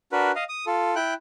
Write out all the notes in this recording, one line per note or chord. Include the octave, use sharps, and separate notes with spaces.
D4 F#4 A#4 B4
D#5 F5
D#6
F4 A4
E4 G5 F#6